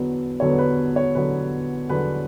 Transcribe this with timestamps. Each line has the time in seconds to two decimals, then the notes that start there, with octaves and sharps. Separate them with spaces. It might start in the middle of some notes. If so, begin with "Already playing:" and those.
Already playing: E2 D3 F#3 B3
0.40 E2 D3 F#3 B3 C#5
0.59 B4
0.96 C#5
1.15 E2 D3 F#3 B3 B4
1.89 E2 D3 F#3 B3 B4